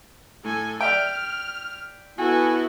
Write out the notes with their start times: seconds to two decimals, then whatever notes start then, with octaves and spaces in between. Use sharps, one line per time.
0.44 A2 A4 G#5
0.81 D5 E5 G5 F6
2.18 B3 E4 F#4 A4 G#5